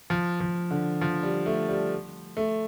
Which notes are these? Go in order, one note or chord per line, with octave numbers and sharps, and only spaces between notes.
F3
F3
D3
F3
G3
A3
G3
A3